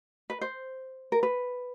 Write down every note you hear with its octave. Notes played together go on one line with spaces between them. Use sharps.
B4
C5
A#4
B4